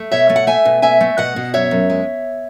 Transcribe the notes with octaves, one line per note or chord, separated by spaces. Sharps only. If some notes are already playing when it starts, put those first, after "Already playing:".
Already playing: A3
B2 C#5 E5
A3
F#5
A3 E5 G#5
B2
A3 E5 G#5
A3
B2 D#5 F#5
B2
F#2 C#5 E5
F#2
G#3